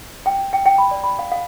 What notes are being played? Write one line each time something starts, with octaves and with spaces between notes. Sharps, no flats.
G5
G5
G5
B5
D5
B5
F5
F5